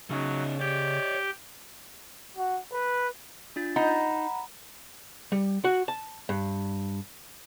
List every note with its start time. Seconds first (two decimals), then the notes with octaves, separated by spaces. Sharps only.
0.10 C#3 F#3 C#4 D#4
0.60 G4 C#5 D5 G5
2.37 F#4
2.73 B4
3.56 D4 F4 A6
3.76 D#4 F#5 A#5 B5
5.32 G3
5.64 F#4
5.88 A5
6.29 G2